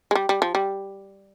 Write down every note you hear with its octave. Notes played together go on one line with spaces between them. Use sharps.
G#3
G3
G3
F3
G3